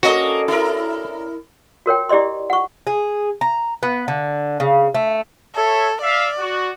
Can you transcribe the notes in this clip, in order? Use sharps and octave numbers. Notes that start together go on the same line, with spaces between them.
A#3 C#4 D4 F#4 A4 D#5
E4 A#4
F#4 A#4 C#5 G5
E4 G4 D5 D#5 C6
F#5 C#6
G#4
A#5
B3
D3
C#3
A3
A4 C#5 E5
D5 E5 F5
F#4